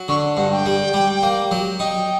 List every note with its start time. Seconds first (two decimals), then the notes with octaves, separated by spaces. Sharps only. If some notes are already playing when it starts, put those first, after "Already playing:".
Already playing: F#3
0.08 D3 C#6
0.37 G2 F#5
0.52 G5
0.66 G3
0.94 G3
1.23 A#3
1.51 F#3
1.79 D#4 G5